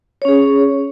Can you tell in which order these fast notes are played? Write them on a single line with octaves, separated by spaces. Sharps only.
C#5 C#4 G#4